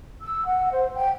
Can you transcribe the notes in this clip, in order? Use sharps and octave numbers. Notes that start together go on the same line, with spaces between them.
E6
F#5
C5
G5